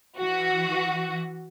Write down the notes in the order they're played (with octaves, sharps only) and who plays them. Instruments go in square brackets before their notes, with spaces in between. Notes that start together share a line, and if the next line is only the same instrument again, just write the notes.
[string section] E3 F#4